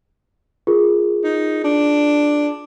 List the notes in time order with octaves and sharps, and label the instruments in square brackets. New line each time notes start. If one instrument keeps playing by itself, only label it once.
[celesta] F4 G#4 A#4
[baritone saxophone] D#4
D4